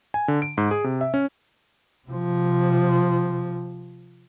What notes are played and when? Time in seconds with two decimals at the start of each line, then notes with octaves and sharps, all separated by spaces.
0.14 G#5
0.28 D3
0.42 D7
0.58 G#2
0.71 G#4
0.84 C3
1.01 E5
1.14 C#4
2.08 C3 F3